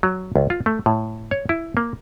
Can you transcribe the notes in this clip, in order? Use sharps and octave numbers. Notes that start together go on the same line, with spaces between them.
F#3
C#2
F4
A3
A2
C#5
E4
A#3